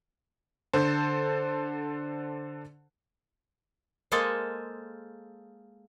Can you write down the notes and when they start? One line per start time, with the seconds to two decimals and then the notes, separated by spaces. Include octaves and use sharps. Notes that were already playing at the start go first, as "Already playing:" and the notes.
0.73 D3 A4 C5
4.12 G#3 A#3 G#4 A4 C5 A5